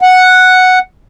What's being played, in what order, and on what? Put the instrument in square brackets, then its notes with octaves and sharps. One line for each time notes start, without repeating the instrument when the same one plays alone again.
[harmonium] F#5